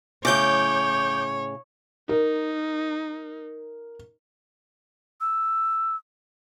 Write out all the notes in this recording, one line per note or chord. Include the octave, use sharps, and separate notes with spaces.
A2 C#3 C#5 D6 G6
D#4 A#4
E6